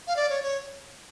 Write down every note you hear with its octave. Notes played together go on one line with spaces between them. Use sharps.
F5
D5
C#5
C#5